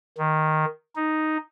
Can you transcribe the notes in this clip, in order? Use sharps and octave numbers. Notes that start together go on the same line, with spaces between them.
D#3
D#4